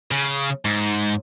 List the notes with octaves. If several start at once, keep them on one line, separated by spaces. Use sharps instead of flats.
C#3
G#2